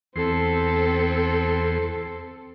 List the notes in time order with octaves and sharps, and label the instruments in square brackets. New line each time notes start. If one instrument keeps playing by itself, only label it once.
[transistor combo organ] E2 C6 [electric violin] C4 A4